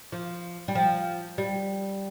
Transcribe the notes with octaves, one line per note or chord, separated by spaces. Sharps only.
F3
G3
F3
G3